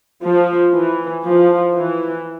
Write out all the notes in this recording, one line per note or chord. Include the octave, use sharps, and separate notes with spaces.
F3
E3
F3
E3